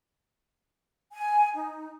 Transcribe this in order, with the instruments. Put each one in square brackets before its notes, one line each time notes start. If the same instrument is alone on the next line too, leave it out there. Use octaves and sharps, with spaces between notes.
[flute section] G#5
D#4